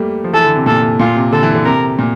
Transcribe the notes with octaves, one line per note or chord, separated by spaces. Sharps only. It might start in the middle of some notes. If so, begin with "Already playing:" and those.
Already playing: G3 A3 A#3
F3
E3 A4
D3
C3
A#2 A4
A#2 F4
C3
D3 A4
E3
D3
C3 A#4
A#2